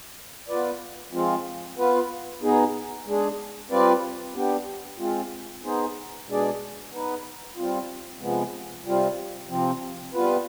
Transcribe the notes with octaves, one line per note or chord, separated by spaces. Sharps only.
B3 F4 B4 D5
F3 G#3 C4 F4
B3 F4 B4
B2 B3 D#4 G#4
G#3 D4 G#4
G3 C4 F4 B4 D5
B3 D4 G4
G#3 C4 F4
B3 D#4 G#4 C5
B2 G#3 D4 G#4 D5
B3 D#4 B4
G3 C4 F4
C3 F3 G#3 B3
C3 G3 C4 F4
C3 F3 C4
G3 B3 F4 B4